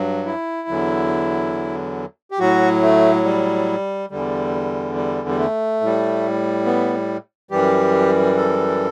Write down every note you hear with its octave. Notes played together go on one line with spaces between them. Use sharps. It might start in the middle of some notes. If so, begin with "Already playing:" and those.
Already playing: G2 F#3
E4
E2 D3 F#3
G4
A2 F#3 F#4
A3
G3
E2 D3 G3
G3
G3
A3
A2 G3
B3
F#2 E3 G3 G4
A4